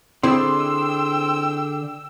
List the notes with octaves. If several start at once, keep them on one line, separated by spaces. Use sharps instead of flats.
D3 C4 E4 G#4 D5 G5 C6 E6